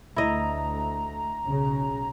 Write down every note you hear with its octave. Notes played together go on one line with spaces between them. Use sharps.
D2 A3 E4 D#5 A#5
B1 C#3 C#4